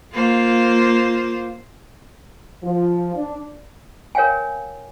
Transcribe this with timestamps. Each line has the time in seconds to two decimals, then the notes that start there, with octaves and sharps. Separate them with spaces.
0.13 A#3 F4 C5
2.63 F3
3.15 D4
4.15 A#4 C#5 F5 G5 G#5